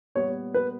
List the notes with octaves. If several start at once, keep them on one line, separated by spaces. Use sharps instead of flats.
A#2 G3 B3 C#5
B4